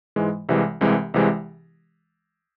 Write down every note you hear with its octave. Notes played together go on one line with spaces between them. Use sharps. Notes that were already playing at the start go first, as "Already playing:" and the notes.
G#2 E3 G#3
C2 C3 E3 G#3
C2 C3 E3 G#3
C2 C3 E3 G#3